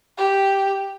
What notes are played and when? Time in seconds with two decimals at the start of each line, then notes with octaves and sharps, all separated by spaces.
0.17 G4